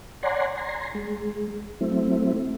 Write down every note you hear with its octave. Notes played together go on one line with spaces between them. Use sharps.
C#5 D5 F#5 G#5 A#5 C6
G#5 A#5 C6
G#3
F#3 A3 C4 E4